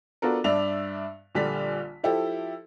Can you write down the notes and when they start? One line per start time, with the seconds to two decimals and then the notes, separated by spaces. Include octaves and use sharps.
0.22 B3 D4 F4 F#4 A4 A#4
0.44 G2 D4 D5 E5 F7
1.35 A#1 D3 G3 D5 B6
2.04 F3 E4 G4 A4